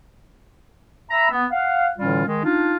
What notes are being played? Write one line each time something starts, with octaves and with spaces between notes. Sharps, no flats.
E5 A#5 B5
B3
F5 F#5
A2 D3 E3 G3 C#4 F4
D#3 G#3
D4 D#4 F4